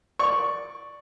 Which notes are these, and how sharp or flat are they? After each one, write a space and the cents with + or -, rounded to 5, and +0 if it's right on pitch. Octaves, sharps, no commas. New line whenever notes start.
D5 +0 C#6 +0